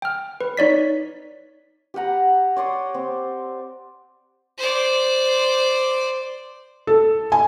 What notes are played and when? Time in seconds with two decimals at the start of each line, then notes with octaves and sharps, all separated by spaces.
0.02 G5 F6
0.41 B4
0.57 D#4 C#5 D5 B6
1.94 G4 B4 F#5 A#5
2.56 C#5 D5 C6 D#6
2.94 C4
4.58 C5 D5
6.87 A4
7.32 G#5